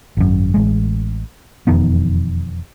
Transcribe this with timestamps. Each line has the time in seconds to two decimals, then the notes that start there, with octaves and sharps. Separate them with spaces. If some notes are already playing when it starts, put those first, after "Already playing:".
0.17 G#1 F#2
0.54 A1 G#3
1.67 E1 F2 D#3 B3